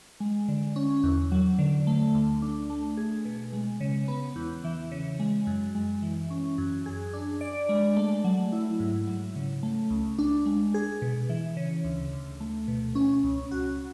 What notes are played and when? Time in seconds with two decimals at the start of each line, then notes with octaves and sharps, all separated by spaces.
0.20 G#3
0.48 D3
0.76 C#4
1.03 E2
1.32 F#3
1.59 D3
1.87 A3
2.14 D2
2.42 D4
2.70 A3
2.97 G#4
3.25 B2
3.53 G#3
3.80 C#3
4.08 B3
4.36 E2
4.64 E3
4.92 C#3
5.20 G#3
5.47 F#2
5.75 G#3
6.02 E3
6.30 C#4
6.58 F#2
6.86 G#4
7.13 D4
7.41 D5
7.69 G#3
7.97 A3
8.24 F#3
8.52 E4
8.80 G#2
9.07 F#3
9.36 C#3
9.63 A3
9.90 C#2
10.19 D4
10.46 G#3
10.74 G#4
11.02 B2
11.29 E3
11.57 C#3
11.84 D2
12.13 D2
12.40 A3
12.68 B2
12.95 C#4
13.24 C#2
13.51 F#4